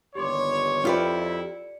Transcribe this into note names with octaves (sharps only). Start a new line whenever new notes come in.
G1 D#2 G4 C#5 C6 D6
F2 E4 F4 G4 B4 D5 C#7